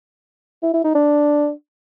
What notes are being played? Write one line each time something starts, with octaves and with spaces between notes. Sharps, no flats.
E4
E4
D#4
D4